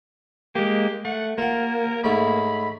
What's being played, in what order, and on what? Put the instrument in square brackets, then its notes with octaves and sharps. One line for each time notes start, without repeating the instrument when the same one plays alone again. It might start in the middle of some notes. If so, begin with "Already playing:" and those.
[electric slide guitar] G#3 A#3 [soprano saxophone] G4
[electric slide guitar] A3 [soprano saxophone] F#5
[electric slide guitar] A#3 [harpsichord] F4 F#5 [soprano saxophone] A#4
[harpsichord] G#2 A3 C#5 [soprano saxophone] B5